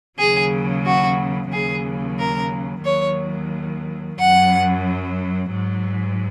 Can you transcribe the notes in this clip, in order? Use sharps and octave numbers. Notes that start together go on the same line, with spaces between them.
D#2 C#3 F#3 G#4
F#4
D#2 C#3 F#3 G#4
A#4
D#2 D#3 F#3 C#5
F#2 F#3 F#5
G#2 F#3